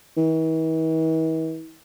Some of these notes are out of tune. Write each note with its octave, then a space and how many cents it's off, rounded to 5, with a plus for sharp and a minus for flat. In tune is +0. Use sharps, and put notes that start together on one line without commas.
E3 -45